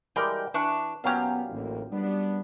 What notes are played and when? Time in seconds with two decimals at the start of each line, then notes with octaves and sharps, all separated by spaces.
0.16 E3 G3 G#3 A#4 D5 G5
0.54 E3 D4 C#6 F#6
1.04 A#2 F#3 B3 C#4 G4 F5
1.49 A1 D2 A#3
1.91 G3 B3 D4